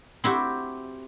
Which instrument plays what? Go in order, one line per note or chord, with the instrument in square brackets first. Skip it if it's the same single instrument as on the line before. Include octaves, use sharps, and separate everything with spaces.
[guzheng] C4 E4 F#4 G4